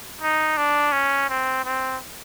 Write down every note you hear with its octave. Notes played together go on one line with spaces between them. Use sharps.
D#4
D4
C#4
C4
C4